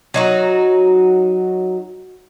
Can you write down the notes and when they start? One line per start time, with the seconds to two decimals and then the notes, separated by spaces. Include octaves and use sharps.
0.14 F#3 D#4 F#4